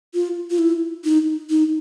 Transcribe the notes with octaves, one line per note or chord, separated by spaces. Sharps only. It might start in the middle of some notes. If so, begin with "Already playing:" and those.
F4
F4
E4
D#4
D#4